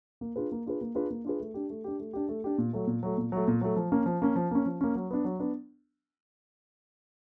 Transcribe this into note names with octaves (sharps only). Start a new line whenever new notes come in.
A#3
D4 F4 G#4 B4
A#3
D4 F4 G#4 B4
A#3
D4 F4 G#4 B4
A#3
D4 F4 G#4 B4
A3
D4 G4
A3
D4 G4
A3
D4 G4
A3
D4 G4
A#2
F#3 A3
A#2
F#3 A3
A#2
F#3 A3
A#2
F#3 A3
F3
A#3 C#4
F3
A#3 C#4
F3
A#3 C#4
F3
A#3 C#4
F#3
B3 D4
F#3
B3 D4